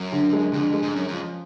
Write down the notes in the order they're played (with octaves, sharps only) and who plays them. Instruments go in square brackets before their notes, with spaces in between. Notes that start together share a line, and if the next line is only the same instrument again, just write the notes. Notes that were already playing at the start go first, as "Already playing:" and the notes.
Already playing: [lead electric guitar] F#2
[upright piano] D3
G#3
[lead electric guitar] F2 [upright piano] D3
[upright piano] G#3
[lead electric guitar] G#2
[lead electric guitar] F#2 [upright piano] C#4
[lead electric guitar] F2 [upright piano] F3